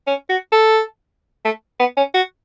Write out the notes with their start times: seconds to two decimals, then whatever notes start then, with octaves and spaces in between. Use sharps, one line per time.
0.07 C#4
0.30 F#4
0.52 A4
1.45 A3
1.80 B3
1.97 C#4
2.14 F#4